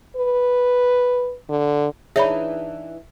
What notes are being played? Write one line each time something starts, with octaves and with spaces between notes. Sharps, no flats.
B4
D3
E3 D4 D#4 G#4 C#5 E5 B5